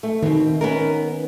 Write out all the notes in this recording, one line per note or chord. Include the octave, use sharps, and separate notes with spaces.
A3
B2 D#3 C4
B3 C#4 A#4